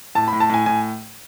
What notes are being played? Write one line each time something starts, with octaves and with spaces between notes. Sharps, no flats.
A2 A5
B5
A2
A5
A2 G#5
A2 G#5